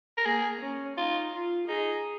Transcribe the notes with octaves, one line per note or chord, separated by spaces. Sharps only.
A#4
A#3 G#4
C#4
D#4 F4
F4
D#4 G#4